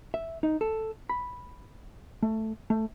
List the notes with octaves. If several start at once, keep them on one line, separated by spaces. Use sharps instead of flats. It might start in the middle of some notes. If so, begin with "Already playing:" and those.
E5
D#4
A4
B5
A3
A3